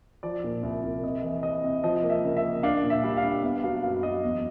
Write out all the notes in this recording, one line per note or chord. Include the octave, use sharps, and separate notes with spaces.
F3 D5
A#2
C2
C2
C3 D#5
E3
C3 D#5
C3
F3 D#5
A#3
E5
C#3
E5
A#3
D4 F5
A#2
E5
G3
E5
F5
D4
B3 E5
F#3 F5
F#2 F5
F#3 D#5
E2